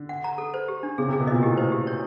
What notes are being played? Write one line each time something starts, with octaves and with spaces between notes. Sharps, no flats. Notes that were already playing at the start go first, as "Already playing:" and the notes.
Already playing: D3
F#5
A#5
A4
C5
G4
D4
C#3 G#4
C3 G#4
B2
A#2 D#5
A2 G4
C5
G4
C#5